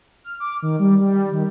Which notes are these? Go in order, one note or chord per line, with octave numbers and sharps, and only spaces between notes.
F6
D6
D#3
G3
G3
D#3